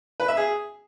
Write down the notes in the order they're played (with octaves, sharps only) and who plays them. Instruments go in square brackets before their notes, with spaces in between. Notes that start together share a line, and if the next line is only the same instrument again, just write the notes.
[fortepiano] B4
E5
G#4